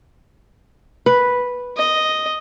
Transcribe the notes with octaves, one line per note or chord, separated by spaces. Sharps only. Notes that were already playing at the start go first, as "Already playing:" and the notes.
B4
D#5